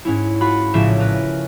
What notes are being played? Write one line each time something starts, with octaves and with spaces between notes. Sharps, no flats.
G#2 C#4 E4
F4 F#4 B5
A#1 A2 C#3 A#4 E5 E7
A#4 B4